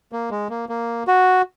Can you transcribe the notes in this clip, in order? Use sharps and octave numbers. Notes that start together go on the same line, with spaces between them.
A#3
G#3
A#3
A#3
F#4